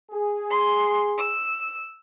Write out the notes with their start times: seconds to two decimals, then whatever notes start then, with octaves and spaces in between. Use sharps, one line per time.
0.11 G#4
0.50 C6
1.18 E6